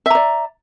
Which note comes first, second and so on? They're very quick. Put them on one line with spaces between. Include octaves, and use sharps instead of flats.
E5 A#5 D5